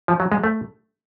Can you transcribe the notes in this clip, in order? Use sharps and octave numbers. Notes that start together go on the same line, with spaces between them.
F3
F#3
G#3
A3